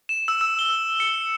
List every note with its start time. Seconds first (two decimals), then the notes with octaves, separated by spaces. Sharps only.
0.09 E7
0.28 E6
0.41 E6
0.59 G7
1.00 C#7